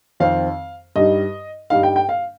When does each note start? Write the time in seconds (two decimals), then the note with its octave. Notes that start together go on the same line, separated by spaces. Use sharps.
0.20 F2 D#3 C4 F5
0.96 G2 G3 D#4 D#5
1.70 G2 G3 D#4 F5
1.83 G5
1.96 G5
2.09 F5